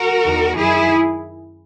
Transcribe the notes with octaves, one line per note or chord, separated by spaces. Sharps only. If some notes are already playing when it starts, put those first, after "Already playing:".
Already playing: F#4 A#4
E2 D#3
F#2 D#3 E4 G#4